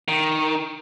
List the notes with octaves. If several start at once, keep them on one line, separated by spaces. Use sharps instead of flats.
D#3